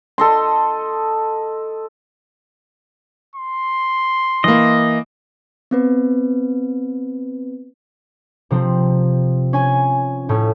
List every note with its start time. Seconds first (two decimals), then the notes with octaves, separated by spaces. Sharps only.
0.18 A4 D#5 C6
3.36 C6
4.44 E3 A#3 D#5
5.71 B3 C4 B4
8.51 C3 F3 C4
9.53 C#4 G#5
10.29 A2 A3 C#4